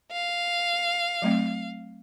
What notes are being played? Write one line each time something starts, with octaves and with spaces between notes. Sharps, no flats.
F5
F#3 A3 C4